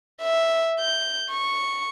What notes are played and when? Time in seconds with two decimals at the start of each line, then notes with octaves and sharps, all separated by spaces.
0.22 E5
0.80 G6
1.31 C#6